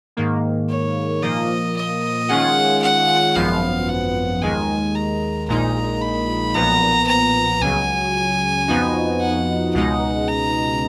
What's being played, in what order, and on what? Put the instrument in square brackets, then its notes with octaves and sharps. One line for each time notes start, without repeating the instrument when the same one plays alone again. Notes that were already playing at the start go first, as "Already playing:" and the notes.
[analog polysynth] G#2 D#3 A#3
[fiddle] C#5
[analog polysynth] A#2 F3 A#3 [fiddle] D#5
[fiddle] D#5
[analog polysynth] D#3 G#3 C#4 F4 G#4 [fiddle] F#5
[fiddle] F#5
[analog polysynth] G#1 F#2 F3 B3 [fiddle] F5
[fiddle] F#5
[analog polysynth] D#2 D#3 G#3 [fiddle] G#5
[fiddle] A#5
[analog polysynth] A#1 A#2 G#3 D#4 [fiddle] A#5
[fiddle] B5
[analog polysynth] B1 A#2 F3 B3 [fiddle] A#5
[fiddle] A#5
[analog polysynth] C#2 C#3 F#3 [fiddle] G#5
[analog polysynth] F2 F3 B3 D#4 F#4
[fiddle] F#5
[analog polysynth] C#2 B2 G#3 D#4 [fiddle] F#5
[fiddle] A#5